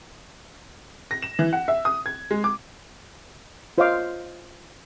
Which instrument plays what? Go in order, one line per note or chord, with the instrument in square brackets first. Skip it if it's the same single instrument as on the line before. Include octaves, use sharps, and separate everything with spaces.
[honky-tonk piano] A#6
E7
E3
F#5
E5
D#6
G#6
G#3
D6
[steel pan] F4 C5 C#5 D#5 F5 D6